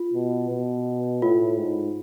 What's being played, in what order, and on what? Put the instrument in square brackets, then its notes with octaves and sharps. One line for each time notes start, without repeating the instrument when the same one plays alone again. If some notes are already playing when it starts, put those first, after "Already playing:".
Already playing: [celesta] F4
[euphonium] B2
B2
[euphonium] A2 [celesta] F4
[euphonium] G#2